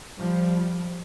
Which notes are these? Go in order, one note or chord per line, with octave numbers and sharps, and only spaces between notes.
F3 G3